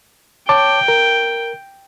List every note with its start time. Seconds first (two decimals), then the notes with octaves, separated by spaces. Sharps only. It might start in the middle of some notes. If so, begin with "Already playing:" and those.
0.49 C#5 G5 A5 D6
0.88 A#4